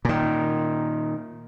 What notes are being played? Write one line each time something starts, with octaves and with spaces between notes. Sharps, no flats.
A#2 D#3